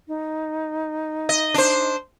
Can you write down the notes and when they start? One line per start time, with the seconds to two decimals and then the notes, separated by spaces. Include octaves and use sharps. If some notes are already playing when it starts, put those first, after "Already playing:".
0.08 D#4
1.29 D#5
1.54 D4 C5